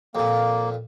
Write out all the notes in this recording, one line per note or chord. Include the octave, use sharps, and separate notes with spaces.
F2 A#2 A#3